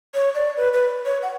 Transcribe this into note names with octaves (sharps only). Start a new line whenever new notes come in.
C#5
D5
B4
B4
C#5
F#5